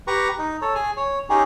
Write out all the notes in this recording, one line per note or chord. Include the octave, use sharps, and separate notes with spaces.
G4 B4 A#5 C#6
D#4
A4 C#5
G#4 G#5
C#5
C#4 D#4 G4 G#4